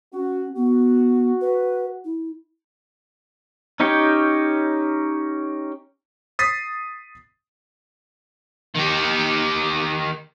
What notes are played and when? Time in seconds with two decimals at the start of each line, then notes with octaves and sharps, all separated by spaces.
0.13 C#4 F#4
0.55 B3 F#4
1.41 B4
2.04 E4
3.80 C#4 D#4 G4 C#5 G5
6.39 D#6 A6 B6 C7
8.75 D#3 G4